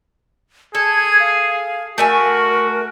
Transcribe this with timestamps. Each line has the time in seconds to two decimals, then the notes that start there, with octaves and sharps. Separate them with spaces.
0.75 G#4 A4 G#6
1.20 F5
1.98 A3 F#4 A#4 E5 G#5